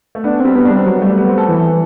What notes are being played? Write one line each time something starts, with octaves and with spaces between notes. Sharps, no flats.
A3
B3 D4
G3 C4
G3 B3
D4
G3
C4
F#3 B3
G3 A3
B3
C4
A4
E3